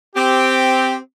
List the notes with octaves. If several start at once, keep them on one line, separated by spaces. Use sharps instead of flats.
C4 G4